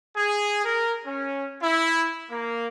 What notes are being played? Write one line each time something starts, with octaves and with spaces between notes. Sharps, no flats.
G#4
A#4
C#4
E4
A#3